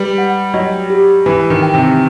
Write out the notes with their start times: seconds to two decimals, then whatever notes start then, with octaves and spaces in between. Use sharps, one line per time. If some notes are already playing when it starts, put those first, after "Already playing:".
Already playing: G3 B4
0.18 F#5
0.54 F#3 D#5
0.90 G4
1.26 E3 B4
1.50 D#3
1.62 G5
1.74 C3